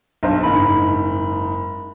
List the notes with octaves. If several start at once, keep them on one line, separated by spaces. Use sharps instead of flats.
B1 G2 C5
F#1 G#2 B5